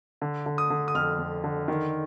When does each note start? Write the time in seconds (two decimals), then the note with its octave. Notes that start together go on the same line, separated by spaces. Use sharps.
0.22 D3
0.46 D3
0.58 D#6
0.70 D3
0.88 D#6
0.95 F2 F6
1.19 F2
1.44 D3
1.68 D#3